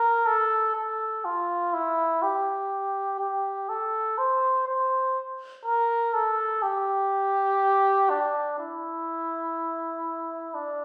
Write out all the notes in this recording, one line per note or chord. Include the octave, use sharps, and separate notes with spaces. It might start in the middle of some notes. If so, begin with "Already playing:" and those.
Already playing: A#4
A4
A4
F4
E4
G4
G4
A4
C5
C5
A#4
A4
G4
D4
E4
D4